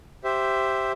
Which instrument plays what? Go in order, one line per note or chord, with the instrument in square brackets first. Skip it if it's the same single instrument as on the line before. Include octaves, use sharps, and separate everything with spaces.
[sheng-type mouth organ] G4 C5 E5